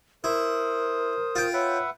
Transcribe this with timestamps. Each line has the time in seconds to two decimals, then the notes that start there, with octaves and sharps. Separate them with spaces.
0.24 E4 A#4 C5 D#6
1.36 F4 G5
1.53 B4 C#5 E5 F#5